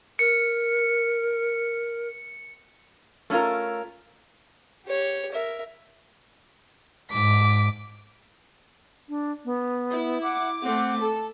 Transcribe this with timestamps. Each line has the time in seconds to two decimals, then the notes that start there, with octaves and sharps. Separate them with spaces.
0.19 A#4 C#7
3.30 A3 C#4 D#4 F4 A#4
4.86 G4 C#5
5.32 A#4 E5
7.12 G#2 D6 B6
9.09 D4
9.45 B3
9.92 E4
10.22 F#5 D6
10.63 A3 C4 F#5
11.01 A4 A5